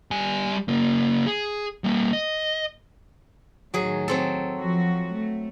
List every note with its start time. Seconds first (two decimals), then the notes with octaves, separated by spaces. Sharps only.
0.11 G3 G#5
0.68 C#3 A#3
1.26 G#4
1.84 G3 A#3
2.13 D#5
3.74 A2 D#3 F#3 G#4
4.08 F#3 C4 A4
4.57 F3 F#4
5.13 A3